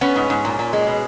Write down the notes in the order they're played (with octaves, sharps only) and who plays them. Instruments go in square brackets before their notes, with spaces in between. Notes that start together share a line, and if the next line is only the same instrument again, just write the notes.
[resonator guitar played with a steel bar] B3 C#4
G#2
G#2
A#2
A#2
G#3
B2